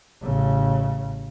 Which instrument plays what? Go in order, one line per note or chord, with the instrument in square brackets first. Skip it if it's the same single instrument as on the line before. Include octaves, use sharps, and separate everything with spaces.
[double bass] A1 C#3